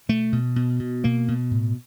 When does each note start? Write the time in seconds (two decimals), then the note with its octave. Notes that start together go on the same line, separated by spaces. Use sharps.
0.09 B2 A3
0.32 B2
0.56 B2
0.80 B2
1.04 B2 A#3
1.28 B2
1.51 A2